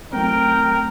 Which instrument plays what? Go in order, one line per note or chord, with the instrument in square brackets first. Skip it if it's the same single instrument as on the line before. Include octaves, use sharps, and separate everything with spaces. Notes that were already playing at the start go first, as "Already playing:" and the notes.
[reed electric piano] F#3 A3 C4 [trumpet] A#4 [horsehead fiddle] G5